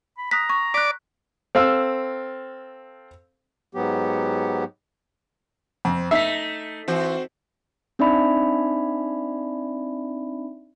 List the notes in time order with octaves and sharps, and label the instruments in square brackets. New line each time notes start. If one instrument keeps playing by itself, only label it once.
[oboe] B5
[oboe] A#5 [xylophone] D#6 F#6 B6
[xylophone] C#6
[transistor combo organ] D5 D6 [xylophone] F#6 B6
[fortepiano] C4 A4 F5 E6
[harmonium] G#2 F#3 B3 G4
[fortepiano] F2 [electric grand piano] C4
[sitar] A3 D#4 [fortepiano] E5 [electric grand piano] B6 C7
[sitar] E3 [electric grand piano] C4 F#4 C5
[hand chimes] C4 D4 D#4 D5 E5 B5